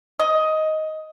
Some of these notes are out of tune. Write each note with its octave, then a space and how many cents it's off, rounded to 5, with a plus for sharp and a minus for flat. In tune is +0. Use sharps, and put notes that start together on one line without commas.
D#5 +10